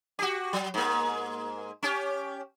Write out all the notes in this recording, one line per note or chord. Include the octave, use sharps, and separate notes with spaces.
F#4 G4
F#3
G#2 A#3
C#4 G4